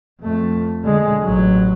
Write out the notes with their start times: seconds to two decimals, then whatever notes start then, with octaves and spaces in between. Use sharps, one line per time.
0.21 F2 A3
0.83 D3 G#3
1.24 A1 F#3